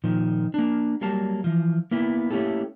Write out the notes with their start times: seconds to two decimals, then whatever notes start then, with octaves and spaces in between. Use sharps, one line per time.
0.04 A#2 D#3 F3
0.54 A#3 D4
1.01 F#3 G3 A#3 F5 A5
1.44 E3 F3
1.91 A#3 B3 E4
2.31 A3 A#3 C#4 E4 G4 A4